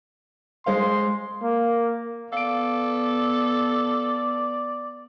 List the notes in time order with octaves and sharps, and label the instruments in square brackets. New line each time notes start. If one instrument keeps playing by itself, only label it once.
[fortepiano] G#3 C5 F5 [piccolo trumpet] C6
[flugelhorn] A#3
[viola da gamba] B3 [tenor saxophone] A4 [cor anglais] D5 [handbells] F5 D7